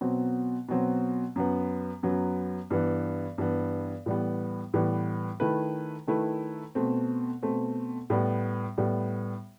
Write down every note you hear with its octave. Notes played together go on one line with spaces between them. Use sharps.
B2 F#3 C4
B2 F#3 C4
F#2 F#3 B3
F#2 F#3 B3
G2 E3 B3
G2 E3 B3
A2 E3 G3 B3
A2 E3 G3 B3
D#3 A3 E4 B4
D#3 A3 E4 B4
B2 A3 C4
B2 A3 C4
A2 G3 B3
A2 G3 B3